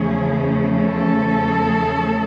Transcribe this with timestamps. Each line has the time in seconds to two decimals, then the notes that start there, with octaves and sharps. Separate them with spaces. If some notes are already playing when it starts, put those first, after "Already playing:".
Already playing: E2 C#3 F3 A3 C#4 G#4
0.80 A4